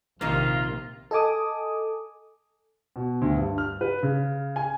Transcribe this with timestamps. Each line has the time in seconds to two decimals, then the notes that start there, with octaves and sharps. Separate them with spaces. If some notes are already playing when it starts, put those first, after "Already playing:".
0.21 A#1 F2 C3 D#3 G3 A#3 F4
1.11 A4 D#5 G#5 D6 D#6
2.96 B2
3.21 D2
3.36 G2
3.58 F6
3.81 B4
4.03 C#3
4.56 G#5